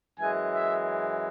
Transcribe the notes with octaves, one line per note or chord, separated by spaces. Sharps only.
F#2 E3 G#3 G#5
E5